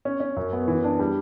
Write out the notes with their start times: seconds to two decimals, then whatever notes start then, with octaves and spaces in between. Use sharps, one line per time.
0.05 C#4
0.20 C#4
0.37 F#2
0.53 B3
0.68 E3
0.84 D4
0.99 G3